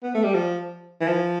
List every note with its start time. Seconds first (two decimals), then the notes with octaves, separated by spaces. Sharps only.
0.03 B3
0.15 A3
0.24 G3
0.35 F3
1.01 E3
1.07 F3